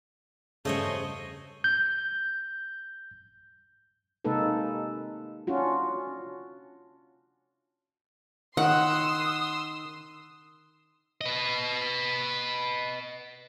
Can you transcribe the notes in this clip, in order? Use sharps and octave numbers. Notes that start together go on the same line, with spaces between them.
E2 G2 C#3 A3 C5 C#5 D#5
G6
C3 G#3 A#3 D#4 A4 B4
C#4 D4 F4 F#4
D#3 F#5 C6 D#6 E6
B4 D#5